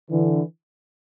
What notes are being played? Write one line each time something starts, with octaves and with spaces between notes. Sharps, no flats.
D3 E3